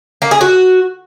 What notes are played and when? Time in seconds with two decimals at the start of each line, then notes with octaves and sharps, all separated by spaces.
0.22 A#3
0.31 G#4
0.41 F#4